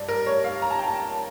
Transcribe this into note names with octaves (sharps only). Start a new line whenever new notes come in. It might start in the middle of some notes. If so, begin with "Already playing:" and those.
Already playing: G2 D5
A#4
C#5
F5
A#5
A5
G5
A5